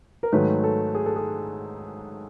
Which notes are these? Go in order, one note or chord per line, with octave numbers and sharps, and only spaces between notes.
A#4
G#2 D#3 F#3 A3 B4
A4
G#4
A4
G#4